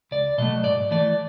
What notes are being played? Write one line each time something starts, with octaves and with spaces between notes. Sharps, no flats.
C#2 D5
B2 F#3 A3 D#5
G#2 D5
E3 A3 D5